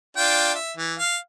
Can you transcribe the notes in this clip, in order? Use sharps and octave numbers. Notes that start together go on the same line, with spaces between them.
D4 F4 G5
E5
E3
F5